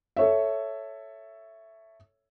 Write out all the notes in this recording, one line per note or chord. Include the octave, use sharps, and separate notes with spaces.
A4 C#5 E5